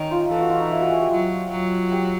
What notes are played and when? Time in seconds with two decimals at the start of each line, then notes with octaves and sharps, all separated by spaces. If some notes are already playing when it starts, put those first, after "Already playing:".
Already playing: D#3 C#4 D#4
0.11 F4
0.30 E3 A4
0.41 F#4
0.50 F4
0.61 D#4
0.71 E4
0.81 F#4
0.90 G#4
1.00 G4
1.10 F#3 F4
1.51 F#3
1.92 G4